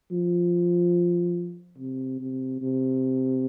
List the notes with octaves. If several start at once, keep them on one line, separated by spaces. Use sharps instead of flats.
F3
C3
C3
C3